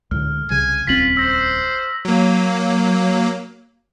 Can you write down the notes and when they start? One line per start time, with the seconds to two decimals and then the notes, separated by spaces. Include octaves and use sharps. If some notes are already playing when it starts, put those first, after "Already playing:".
0.11 C#2 A2 D3 F6
0.50 C2 C#3 G#5
0.87 D#1 C#2 C4 F4 B6 F#7
1.17 C5 E6 A#6
2.05 F#3 A#3